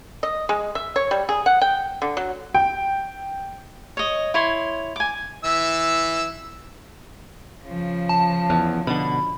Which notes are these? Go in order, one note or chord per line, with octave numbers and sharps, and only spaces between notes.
D#5
G#3
E5
C#5
G3
G#4
F#5
G5
D3
F#3
G5
C#5 D#5
E4 C#5 C6
G#5 D6
E3 E5 E6
C#3 F3
A5
E2
B2 D3 B5